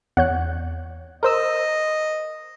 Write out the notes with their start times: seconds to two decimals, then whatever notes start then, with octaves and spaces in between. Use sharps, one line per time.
0.17 E2 C#5 F#5 F#6
1.23 A#4 C5 D#5 E6